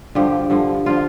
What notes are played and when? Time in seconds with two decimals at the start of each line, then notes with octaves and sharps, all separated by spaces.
0.15 G2 D3 F3 G4
0.50 G2 D3 F3
0.86 D3 F3 F4